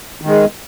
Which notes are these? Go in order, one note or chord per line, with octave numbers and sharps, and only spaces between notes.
D#3
G#3